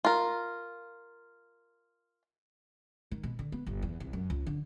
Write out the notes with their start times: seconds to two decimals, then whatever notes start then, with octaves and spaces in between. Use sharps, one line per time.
0.05 F4 A#4
3.11 D#3
3.23 B2
3.39 D3
3.52 B3
3.66 G1
3.82 E2
4.00 C2
4.13 F#2
4.30 C#2
4.47 D3